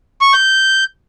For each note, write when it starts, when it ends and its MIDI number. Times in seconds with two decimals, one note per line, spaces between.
0.21 0.33 85
0.33 0.84 91